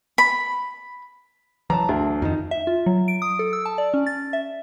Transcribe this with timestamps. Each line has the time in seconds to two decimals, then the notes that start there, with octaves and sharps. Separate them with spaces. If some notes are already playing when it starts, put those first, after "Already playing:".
0.18 B5
1.70 E3 F#3 A5 A#5
1.89 D2 D4
2.22 F2 D#3 D#4
2.51 E5
2.67 F4
2.86 F#3
3.08 D7
3.22 D#6
3.39 A4
3.53 E6
3.66 A5
3.78 D5
3.94 C#4
4.07 A6
4.33 E5